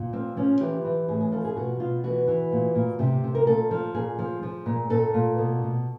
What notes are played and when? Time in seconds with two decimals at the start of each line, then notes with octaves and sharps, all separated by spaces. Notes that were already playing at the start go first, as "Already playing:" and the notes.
Already playing: A#2
0.13 F3 C4
0.37 F3 C#4
0.60 E3 G4
0.85 E3
1.08 A2 G#4
1.21 G#4
1.32 F3 A4
1.45 G#4
1.56 B2 F#4
1.79 B2 F4
2.04 E3 F#4
2.28 E3
2.52 A#2
2.75 A#2
2.99 C3 G4
3.24 C3
3.35 A#4
3.47 A#2 A4
3.71 F3
3.94 A#2 G#4
4.19 F3
4.43 F3
4.66 A#2
4.90 A#2 A4
5.14 A#2
5.38 B2
5.62 B2